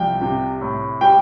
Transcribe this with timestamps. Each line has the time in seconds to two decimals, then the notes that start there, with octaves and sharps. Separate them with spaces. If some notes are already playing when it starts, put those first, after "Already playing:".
Already playing: C2 F3 G5
0.21 C3
0.61 A2
1.01 G3 G5